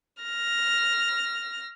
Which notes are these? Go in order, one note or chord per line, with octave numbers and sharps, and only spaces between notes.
F6 A#6